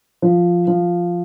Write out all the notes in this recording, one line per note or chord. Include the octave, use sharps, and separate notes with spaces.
F3
F3